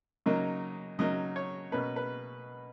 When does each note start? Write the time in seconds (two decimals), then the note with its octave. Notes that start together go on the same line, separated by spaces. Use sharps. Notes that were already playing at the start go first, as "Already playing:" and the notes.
0.26 C#3 F#3 A#3 D#4
0.99 C#3 F#3 A#3 D#4 D#5
1.36 C#5
1.72 B2 A#3 C#4 B4
1.96 B4